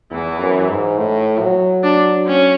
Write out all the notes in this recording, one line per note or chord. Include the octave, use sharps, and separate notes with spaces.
E2 E3
F#2
G#2
A2
F#3
D4
C#4